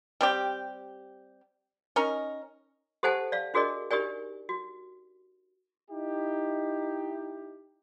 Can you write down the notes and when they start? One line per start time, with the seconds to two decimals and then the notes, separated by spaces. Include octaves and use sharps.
0.21 G3 C4 G4
1.96 C#4 D#4 A#4
3.03 G4 A4 C5 F#5 G#5 A5
3.32 D5 F5
3.54 D4 F#4 G#4 A#4 D5 D#5
3.91 D#4 G4 A#4 D5 G#5
4.49 F#4
5.90 D#4 E4 G4